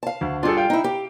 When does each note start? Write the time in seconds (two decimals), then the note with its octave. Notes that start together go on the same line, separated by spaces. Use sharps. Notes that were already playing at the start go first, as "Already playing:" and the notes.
0.03 F5 A5
0.21 D2
0.43 G3 D4 F4 G#4 A4
0.57 F5 G5
0.70 D#4 E4
0.84 G4